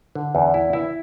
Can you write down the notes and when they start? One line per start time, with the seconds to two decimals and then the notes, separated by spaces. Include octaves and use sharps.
0.15 D3
0.35 E2
0.54 E4
0.73 E4